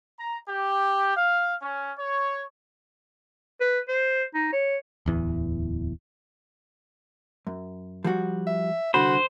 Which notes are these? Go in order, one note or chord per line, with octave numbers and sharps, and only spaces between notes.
A#5
G4
F5
C#4
C#5
B4
C5
D#4
C#5
D1 E2 E3
F#2
F3 G3 F#4
E5
C2 D3 F#4 C5 B5